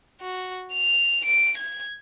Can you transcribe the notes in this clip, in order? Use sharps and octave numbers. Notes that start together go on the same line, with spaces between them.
F#4
F7
D7
G#6